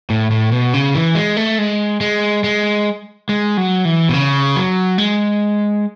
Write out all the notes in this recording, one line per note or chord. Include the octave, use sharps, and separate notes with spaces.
A2
A2
B2
C#3
E3
G#3
A3
G#3
G#3
G#3
G#3
F#3
E3
B2
C#3
F#3
G#3